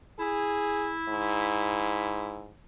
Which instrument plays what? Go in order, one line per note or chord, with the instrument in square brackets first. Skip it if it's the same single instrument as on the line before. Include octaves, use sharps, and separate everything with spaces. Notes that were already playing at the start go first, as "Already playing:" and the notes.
[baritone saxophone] E4 [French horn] G#4
[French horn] G#2